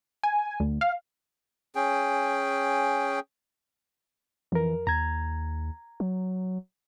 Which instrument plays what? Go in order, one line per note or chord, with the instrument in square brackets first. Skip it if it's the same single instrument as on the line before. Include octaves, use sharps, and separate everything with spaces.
[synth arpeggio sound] G#5
D2
F5
[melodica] C#4 G#4 G5
[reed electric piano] F2 A#4 [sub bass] E3
[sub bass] D#2 [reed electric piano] A#5 G#6
[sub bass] F#3